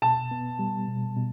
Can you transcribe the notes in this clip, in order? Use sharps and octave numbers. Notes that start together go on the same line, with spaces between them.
B2 A5
B3
G3
B2
B2